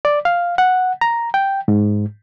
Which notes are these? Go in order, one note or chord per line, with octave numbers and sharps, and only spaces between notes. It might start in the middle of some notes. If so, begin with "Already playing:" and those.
D5
F5
F#5
A#5
G5
G#2